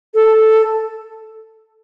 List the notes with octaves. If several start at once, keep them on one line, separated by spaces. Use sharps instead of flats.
A4